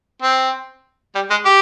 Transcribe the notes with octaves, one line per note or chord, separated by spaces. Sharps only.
C4
G3
G#3
G4